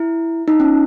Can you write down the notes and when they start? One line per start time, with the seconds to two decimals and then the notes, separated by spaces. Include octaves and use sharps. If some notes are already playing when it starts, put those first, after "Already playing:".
Already playing: E4
0.48 D#4
0.60 C#4